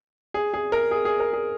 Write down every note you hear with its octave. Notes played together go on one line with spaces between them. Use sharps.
G#4
G#4
A#4
G#4
G#4
A#4
G#4